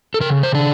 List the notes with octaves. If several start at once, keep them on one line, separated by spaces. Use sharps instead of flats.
A4
C#3 A#4
C5
D4